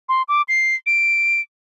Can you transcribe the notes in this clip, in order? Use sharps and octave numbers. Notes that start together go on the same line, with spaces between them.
C6
D6
C7
D7